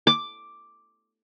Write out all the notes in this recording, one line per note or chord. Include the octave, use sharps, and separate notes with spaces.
D6